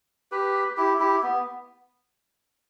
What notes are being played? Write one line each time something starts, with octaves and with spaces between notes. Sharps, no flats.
G4 B4
E4 G4
E4 G4
B3